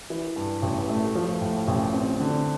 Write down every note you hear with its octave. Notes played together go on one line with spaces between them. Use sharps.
E3
G2
A1
A3
F3
A2
A1
C4
D3